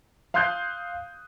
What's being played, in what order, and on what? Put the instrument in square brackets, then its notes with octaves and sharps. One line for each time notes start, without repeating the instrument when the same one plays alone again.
[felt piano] F5 C6 D#6 F#6 G6 C7